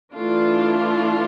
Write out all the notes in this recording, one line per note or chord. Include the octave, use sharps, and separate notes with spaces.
E3 A3 D4 F4